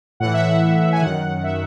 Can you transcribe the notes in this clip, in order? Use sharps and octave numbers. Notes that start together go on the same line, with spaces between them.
A2 E3 F#5
E5
F#5
G#5
F#2 D#3 F#5
E5